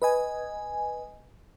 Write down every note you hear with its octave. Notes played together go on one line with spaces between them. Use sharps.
B4 D#5 G#5